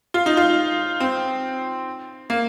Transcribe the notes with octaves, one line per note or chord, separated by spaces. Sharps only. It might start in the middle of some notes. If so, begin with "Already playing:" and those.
F4
D#4
F4
C4
A#3